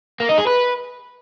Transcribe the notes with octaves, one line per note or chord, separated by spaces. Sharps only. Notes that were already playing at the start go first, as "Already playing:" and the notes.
A#3
D#4
G#4
B4